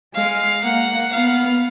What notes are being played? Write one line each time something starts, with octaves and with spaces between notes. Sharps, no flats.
G#3 F5
A#3 F#5
B3 F5